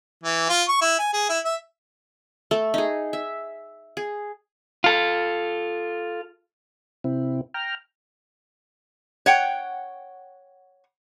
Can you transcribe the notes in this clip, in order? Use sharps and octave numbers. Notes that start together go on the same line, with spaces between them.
E3
F4
C#6
E4
G#5
G#4
E4
E5
A3 A4
D#4 G#4
E5
G#4
F4 A4
C3 C4 E4
G5 A#5 F6
C#5 F#5 G5